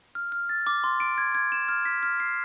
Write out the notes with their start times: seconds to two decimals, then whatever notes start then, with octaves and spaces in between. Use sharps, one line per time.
0.15 F6
0.32 F6
0.49 A6
0.67 D6
0.84 C6
1.00 D7
1.18 G#6
1.35 G#6
1.52 E7
1.69 F6
1.85 B6
2.03 F6
2.20 C7